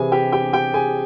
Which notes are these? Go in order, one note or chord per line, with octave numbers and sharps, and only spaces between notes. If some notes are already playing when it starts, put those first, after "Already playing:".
Already playing: C3 E3 G#4 G#5
G4 G5
G4 G5
G4 G5
G#4 G#5